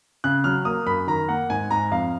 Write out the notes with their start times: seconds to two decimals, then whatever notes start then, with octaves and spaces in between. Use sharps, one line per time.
0.24 C#3 F#6
0.44 F#3 F6
0.65 A#3 D#6
0.86 F#2 B5
1.07 D#3 A#5
1.29 A#3 F#5
1.50 G#2 G#5
1.71 G#2 A#5
1.91 F2 F5